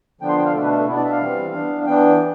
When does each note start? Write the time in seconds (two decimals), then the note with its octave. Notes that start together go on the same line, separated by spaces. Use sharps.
0.21 D3 F3 B3 D4 G5
0.29 C6
0.38 G5
0.45 F5
0.54 B2 A3 D4 A4
0.62 B4
0.71 A4
0.87 B2 B3 D4 E4
0.95 D5
1.04 E5
1.12 F5
1.21 E3 G3 C4
1.54 E3 B3 D4
1.86 E3 B3 D4 G5
2.19 E3